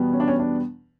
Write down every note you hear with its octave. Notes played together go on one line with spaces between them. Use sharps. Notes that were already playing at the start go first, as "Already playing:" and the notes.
Already playing: E2 B2 G3 B3
C#4
D4
C#4
D4